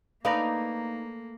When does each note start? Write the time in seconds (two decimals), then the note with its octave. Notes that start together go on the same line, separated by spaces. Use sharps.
0.25 A3 A#3 D#4 B4 D5 F5 A#6